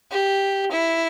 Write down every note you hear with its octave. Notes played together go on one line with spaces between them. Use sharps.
G4
E4